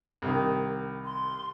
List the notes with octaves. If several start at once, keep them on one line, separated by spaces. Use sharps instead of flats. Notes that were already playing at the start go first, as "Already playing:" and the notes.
C2 D#3
C6